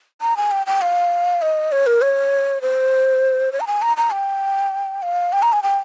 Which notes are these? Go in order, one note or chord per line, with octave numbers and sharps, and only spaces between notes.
A#5
G#5
G5
G5
F5
D#5
C#5
A#4
C#5
C5
C#5
A#5
G#5
A#5
A#5
G5
F5
G5
A#5
G#5
G5